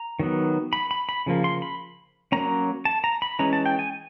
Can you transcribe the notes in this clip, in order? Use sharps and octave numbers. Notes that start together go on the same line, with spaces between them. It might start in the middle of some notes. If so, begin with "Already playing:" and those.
Already playing: A#5
D#3 F#3 B3
B5
B5
B5
C#3 F3 A#3
C6
B5
F#3 A#3 C#4 A#5
A5
A#5
B5
E3 G#3 C#4 A#5
A5
G5
G#5